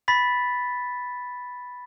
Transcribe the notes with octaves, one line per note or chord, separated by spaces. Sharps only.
B5 A6 B6